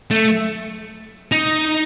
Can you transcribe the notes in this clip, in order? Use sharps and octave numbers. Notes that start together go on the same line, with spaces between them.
A3
D#4